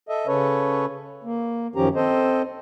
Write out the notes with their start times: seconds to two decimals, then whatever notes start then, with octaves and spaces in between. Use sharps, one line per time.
0.09 A4 D#5 E5
0.27 C#3 C#4 A4 B4 C#5
1.24 A#3
1.76 F#2 D#3 F3 C#4 G4 A#5
1.95 C4 A4 C5 D#5